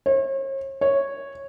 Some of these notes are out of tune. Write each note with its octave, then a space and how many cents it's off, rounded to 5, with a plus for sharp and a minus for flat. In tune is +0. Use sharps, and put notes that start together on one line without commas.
C#5 -40
C#5 -5